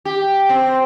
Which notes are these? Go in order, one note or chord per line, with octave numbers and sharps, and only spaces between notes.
G4
C4